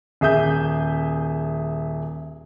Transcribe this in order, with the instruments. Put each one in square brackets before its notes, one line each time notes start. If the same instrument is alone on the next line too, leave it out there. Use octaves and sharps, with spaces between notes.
[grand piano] D#1 G#4 E5 D#6 G6